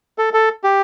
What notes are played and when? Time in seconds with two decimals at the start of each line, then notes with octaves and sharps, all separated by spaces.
0.18 A4
0.33 A4
0.64 G4